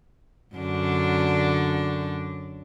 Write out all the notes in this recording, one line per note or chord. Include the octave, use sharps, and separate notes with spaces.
F#2 D3 D4